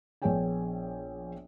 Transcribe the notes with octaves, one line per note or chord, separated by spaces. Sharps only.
A#1 B3 G#4 C#5 G5 G#5